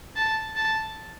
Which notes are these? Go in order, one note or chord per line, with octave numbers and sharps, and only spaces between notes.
A5
A5